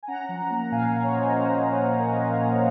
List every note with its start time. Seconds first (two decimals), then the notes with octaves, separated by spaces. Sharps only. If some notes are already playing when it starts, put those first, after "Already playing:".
0.03 G#5
0.08 C#4 F#5 A#5
0.29 F3
0.50 A#3
0.72 A#2 F5 G#5
0.93 C#4
1.04 C#5
1.14 F3 C5 D#5
1.36 A#3 C5
1.57 A#2
1.79 C#4
1.99 F3 A#4
2.21 A#3
2.42 A#2